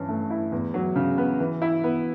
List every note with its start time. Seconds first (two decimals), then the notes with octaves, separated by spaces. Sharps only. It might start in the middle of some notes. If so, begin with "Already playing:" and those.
Already playing: G2 E3 C#4
0.09 A3
0.30 E4
0.52 E2
0.74 F#3
0.96 C#3
1.18 B3
1.40 E3
1.62 E4
1.84 B3